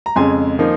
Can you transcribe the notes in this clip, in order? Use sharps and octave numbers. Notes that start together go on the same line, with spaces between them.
A#5
F2 C#3 G#3 C#4 G#5 C6
F3 A#3 D#4